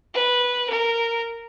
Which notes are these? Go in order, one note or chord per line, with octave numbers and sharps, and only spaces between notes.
B4
A#4